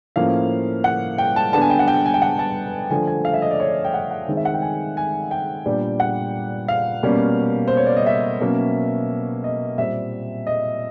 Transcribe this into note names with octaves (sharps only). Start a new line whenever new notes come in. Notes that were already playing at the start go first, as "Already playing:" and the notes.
A2 F3 A#3 C#4 F5
F#5
G5
A5
D3 G3 B3 D4 A5
G#5
G5
F#5
G5
G#5
G5
F#5
A5
D3 F3 A3 G#5
G#5
F5
E5
D#5
D5
C#5
D5
G5
F#5
F#5
D#3 G#3 C4
E5
F#5
G5
G#5
G#5
G5
A#2 G3 B3 D4
F#5
F5
B2 G3 A#3 C#4
C5
C#5
D5
D#5
E5
B2 F#3 A#3 C#4
D#5
A#2 G3 C4 E5
D#5